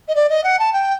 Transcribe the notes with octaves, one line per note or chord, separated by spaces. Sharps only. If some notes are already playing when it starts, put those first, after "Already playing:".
D#5
D5
D#5
F#5
A5
G5